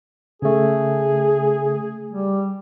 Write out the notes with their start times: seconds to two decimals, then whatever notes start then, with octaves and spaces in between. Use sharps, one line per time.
0.42 C#3 A3 G#4
2.11 G3